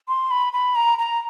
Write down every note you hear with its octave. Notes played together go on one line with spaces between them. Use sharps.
C6
B5
B5
A#5
A#5